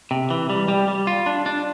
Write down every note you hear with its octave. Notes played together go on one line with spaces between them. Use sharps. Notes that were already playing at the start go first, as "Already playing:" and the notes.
C3
E3
G3
G3
G3
F4
D4
D4